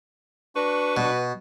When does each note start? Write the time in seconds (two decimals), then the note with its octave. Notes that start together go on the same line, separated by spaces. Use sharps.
0.56 D4 F#4 B4 C#6
0.97 B2